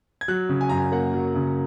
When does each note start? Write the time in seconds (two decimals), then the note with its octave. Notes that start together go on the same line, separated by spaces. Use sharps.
0.21 G#6
0.28 F#3 F#6
0.49 C#3
0.61 G#5
0.69 F#2 A#5
0.78 G#5
0.92 A#3 F#5
1.14 F#3
1.35 C#3